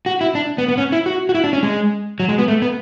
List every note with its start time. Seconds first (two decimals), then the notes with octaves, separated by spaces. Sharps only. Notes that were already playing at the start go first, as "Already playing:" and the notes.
0.06 F#4
0.21 E4
0.35 D4
0.58 B3
0.68 B3
0.78 C#4
0.92 E4
1.06 F#4
1.29 F#4
1.35 E4
1.44 D4
1.53 C#4
1.63 G#3
2.20 F#3
2.29 G#3
2.38 B3
2.48 A3
2.62 B3